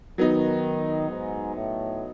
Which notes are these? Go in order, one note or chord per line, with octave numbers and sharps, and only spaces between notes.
D#3 F#3 B3 D#4
G#2
A2